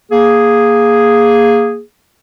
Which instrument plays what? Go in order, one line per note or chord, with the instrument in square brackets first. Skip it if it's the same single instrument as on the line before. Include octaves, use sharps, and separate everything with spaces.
[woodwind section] A#3 G#4